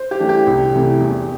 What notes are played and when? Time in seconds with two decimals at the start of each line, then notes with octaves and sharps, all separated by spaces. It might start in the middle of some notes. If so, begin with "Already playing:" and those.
Already playing: C5
0.11 G4
0.20 E3 A3 D4
0.29 G4
0.47 C2
0.73 C3 E3 A3
1.01 E2